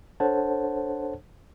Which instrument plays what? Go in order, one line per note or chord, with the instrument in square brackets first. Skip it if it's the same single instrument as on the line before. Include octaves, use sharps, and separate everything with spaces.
[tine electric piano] D4 A4 C5 C#5 F#5 A5